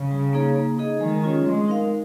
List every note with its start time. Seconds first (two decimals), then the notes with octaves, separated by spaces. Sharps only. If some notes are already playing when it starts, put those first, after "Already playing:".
Already playing: C#3
0.11 G3
0.33 A#3 D#4 G#4 C#5
0.56 A#3
0.78 D#4 G#4 D#5
1.01 D#3 G#3
1.24 C#4 F4 G#4 C#5
1.46 G#3 C4
1.68 D#4 A#4 F5